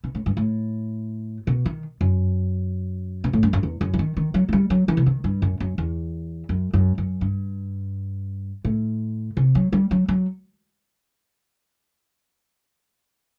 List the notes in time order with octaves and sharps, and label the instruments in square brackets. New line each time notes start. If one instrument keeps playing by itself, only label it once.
[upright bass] B2
A2
G2
A2
B2
D#3
F#2
B2
A2
G2
F#2
E2
F#2
E3
D#3
D#3
F#3
A3
G3
F#3
E3
C3
D#3
G2
F#2
F#2
E2
F#2
F#2
F#2
G2
A2
C3
F#3
G3
F#3
F#3